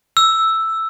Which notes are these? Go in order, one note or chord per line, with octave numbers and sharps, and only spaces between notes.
E6